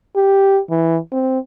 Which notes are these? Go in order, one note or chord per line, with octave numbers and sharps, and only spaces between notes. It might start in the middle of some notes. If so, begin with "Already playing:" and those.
G4
E3
C4